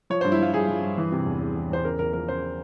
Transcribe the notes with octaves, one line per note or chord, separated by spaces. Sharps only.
F3 C#5
G2 C5
E4
F3 F4
G2 G#4
F3
G2
E3
C3
E2
E2
E2
E2 C5
C#3 A#4
E2 A#4
F3 A#4
C#3 C5